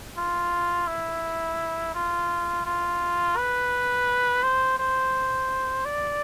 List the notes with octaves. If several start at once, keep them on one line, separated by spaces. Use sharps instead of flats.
F4
E4
F4
F4
B4
C5
C5
D5